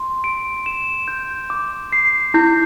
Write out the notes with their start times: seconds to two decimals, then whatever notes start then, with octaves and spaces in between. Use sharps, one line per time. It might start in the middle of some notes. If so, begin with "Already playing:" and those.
Already playing: C6
0.24 D7
0.66 E7
1.08 G6
1.50 D6
1.93 C7
2.34 E4 G6